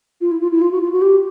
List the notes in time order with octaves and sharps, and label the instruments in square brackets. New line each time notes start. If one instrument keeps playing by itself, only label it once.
[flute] F4
E4
F4
E4
F4
F#4
F4
F#4
G4